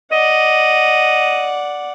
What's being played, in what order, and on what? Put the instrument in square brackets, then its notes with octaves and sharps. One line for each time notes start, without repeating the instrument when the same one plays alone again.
[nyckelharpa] D5 F#5 [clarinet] D#5